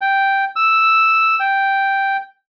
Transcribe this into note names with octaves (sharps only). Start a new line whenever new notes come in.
G5
E6
G5